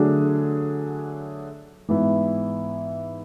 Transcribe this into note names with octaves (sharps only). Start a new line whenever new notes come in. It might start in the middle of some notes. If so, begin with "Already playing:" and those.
Already playing: D3 F#3 A3 D4 G#4
G#2 E3 B3 E4